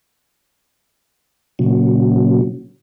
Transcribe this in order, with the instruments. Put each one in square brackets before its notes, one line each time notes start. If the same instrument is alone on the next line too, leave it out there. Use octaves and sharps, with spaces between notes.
[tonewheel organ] A#2 C#3 F#3